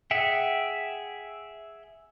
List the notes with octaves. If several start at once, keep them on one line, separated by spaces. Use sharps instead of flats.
G#4 E5 F#5 G5